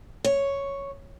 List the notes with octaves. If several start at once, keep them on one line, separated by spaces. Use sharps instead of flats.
C#5